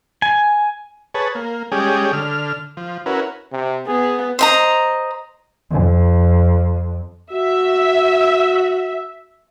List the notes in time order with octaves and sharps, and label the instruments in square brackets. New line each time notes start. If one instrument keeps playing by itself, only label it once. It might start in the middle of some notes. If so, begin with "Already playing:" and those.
[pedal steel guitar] G#5
[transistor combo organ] G#4 B4 C#5 A5
A#3
G3 G#3 C#4 G4 G#4
D3 F6
F3
C#4 E4 F#4 A#4 B4
[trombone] C3
[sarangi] B3 [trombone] G#4
[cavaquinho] C5 D#5 A#5
[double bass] F2
[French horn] F#4 [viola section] E5